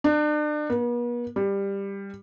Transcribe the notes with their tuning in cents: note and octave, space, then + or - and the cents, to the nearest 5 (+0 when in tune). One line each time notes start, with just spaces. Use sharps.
D4 +35
B3 -45
G3 +15